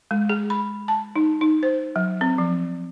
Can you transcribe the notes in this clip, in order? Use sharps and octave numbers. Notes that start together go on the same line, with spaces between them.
G#3
G#4
B5
A5
D#4
D#4
C5
F#3
C4
F3